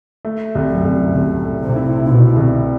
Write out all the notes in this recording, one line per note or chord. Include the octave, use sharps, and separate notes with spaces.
A3
C2
F#2
C2
C2 A2
A3
C3
E4
B2 E4
C2